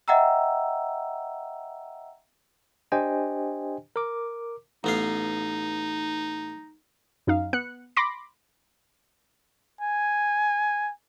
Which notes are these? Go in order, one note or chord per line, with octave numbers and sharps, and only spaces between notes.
D#5 E5 F#5 G5 A#5 E6
D4 G4 C5 D#5 G5 G#5
A#4 D6
A1 B3 D#4 F5
F#2 D#4 F5
B3 F#6 C#7
B5 C6 D6 A#6
G#5